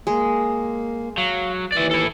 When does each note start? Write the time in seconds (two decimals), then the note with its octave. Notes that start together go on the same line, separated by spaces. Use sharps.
0.07 G#3 A#3
1.18 F#3 F5
1.72 D#2 E3 D5 E5
1.91 E4 A4